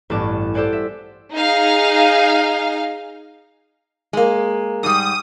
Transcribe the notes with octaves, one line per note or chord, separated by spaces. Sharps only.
A1 G2 B3 C#4 A5 D6
G4 A4 C5 D5 F#5 G#5
E5
D#4 G#4 F5
G#3 A#3
G#2 G3 D#6